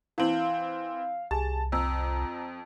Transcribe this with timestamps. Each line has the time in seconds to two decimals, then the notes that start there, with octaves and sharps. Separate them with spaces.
0.18 E3 C4 E4 F5 F#7
1.31 C2 G4 G#4 G#5 A5
1.72 F2 A#5 E6